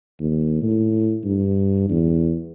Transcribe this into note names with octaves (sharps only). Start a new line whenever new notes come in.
D#2
A2
G2
E2